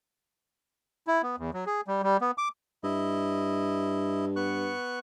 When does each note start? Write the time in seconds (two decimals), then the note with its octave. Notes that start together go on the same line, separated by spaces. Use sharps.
1.07 E4
1.23 B3
1.38 E2
1.54 F#3
1.66 G#4
1.88 G3
2.03 G3
2.21 B3
2.38 D6
2.84 G2 E4 D#5
4.36 B3 C#6 F#6